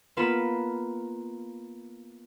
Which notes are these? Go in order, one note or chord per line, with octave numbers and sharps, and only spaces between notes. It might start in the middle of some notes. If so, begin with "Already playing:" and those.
A#3 B3 F4 B4 B5 E7